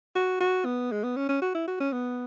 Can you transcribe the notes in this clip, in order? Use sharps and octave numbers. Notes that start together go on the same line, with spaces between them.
F#4
F#4
B3
G#3
B3
C#4
C#4
F#4
E4
F#4
C#4
B3